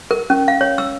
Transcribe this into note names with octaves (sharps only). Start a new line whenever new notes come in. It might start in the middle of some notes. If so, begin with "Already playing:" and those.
A#4
C#4
F5
C#5
E6